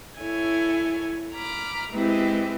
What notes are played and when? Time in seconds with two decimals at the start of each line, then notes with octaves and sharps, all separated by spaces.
0.20 E4 A4 C#5 G#5
1.34 A#5 B5 D6 F6
1.93 G#3 C4 E4 G4 B4